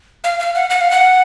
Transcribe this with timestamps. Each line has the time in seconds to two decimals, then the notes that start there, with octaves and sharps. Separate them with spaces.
0.24 F5
0.40 F5
0.55 F#5
0.70 F#5
0.81 F5
0.91 F#5